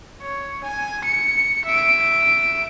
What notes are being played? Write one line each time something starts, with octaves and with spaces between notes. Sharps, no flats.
C#5
G#5
C#7
E5 D7